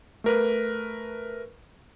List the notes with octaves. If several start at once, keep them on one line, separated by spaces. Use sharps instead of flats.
A3 A#4 B4